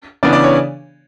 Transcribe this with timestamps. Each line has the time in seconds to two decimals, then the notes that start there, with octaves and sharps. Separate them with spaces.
0.23 C#3 E3 B3 D4 D5
0.33 D5
0.44 C#5